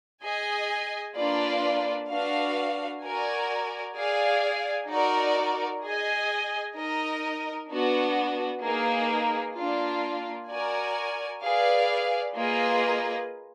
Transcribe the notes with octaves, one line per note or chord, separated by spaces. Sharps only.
G#4 D#5 G#5
A#3 D4 F4 B4 D5
D4 F#4 B4 F5
F#4 A#4 D5 G#5
G#4 D5 F5 G#5
D#4 F#4 A#4 D5
G#4 D#5 G#5
D#4 A#4 D#5
B3 D4 F#4
A#3 D#4 G#4 B4
A#3 D4 F4
F#4 A#4 D5 G#5
G#4 B4 D5 F5
A#3 F4 G#4 B4 D#5